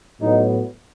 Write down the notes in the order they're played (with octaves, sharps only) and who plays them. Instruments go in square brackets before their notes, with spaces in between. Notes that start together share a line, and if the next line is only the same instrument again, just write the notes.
[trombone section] A2 F#3 B3 D#4